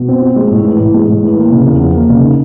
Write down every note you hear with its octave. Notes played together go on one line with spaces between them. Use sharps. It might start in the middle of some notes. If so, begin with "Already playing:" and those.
Already playing: B2
C4
F4
G#3
A2
E3
A2
G#3
A2
E3
A#3
C#3
E2
F3
A#3
C#3
D#4